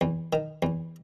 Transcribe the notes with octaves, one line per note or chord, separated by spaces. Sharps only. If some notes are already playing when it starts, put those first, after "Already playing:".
E2
D#3
E2